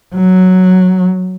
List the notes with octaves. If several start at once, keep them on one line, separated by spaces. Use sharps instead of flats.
F#3